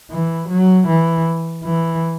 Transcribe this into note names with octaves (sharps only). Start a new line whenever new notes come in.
E3
F#3
E3
E3